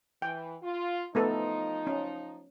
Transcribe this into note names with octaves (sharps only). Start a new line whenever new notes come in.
E3 G5
F4
F3 A3 B3 D#4 A4
C#4